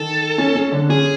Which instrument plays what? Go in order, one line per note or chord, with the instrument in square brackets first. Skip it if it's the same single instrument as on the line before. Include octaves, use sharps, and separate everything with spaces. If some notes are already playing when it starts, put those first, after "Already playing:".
Already playing: [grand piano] D#3 [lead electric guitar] A4
[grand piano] C#4
C#4
D3 D4
[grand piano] C#4 [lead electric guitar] G#4